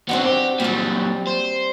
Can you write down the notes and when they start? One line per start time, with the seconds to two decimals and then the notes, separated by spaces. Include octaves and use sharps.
0.09 B3 C4 D4 D#4 F#4
0.25 G4
0.60 A#2 F#3 G3 D5
1.27 C5